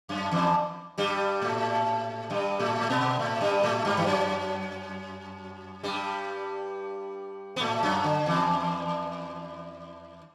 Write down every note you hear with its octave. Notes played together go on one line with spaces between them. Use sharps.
F#2
E2 E3
G2 G3
A2 A3
G2 G3
A2 A3
A3
B2 B3
A2 A3
G2 G3
A2 A3
G2 G3
E3
F#2 F#3
G2 G3
B3
A2 A3
F#2 F#3
D3
E2 E3